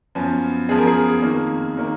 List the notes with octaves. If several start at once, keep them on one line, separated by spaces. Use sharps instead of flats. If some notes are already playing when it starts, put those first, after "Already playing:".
F#2 F3 B3
F#2 F3 B3 G#4
A#4
G#4
F2 D#3 A#3
D#3 A#3